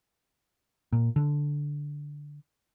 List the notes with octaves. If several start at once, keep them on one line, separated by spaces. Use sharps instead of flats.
A#2
D3